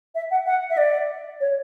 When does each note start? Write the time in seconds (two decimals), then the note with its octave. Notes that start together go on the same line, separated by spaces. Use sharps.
0.15 E5
0.31 F#5
0.46 F#5
0.70 E5
0.77 D5
1.41 C#5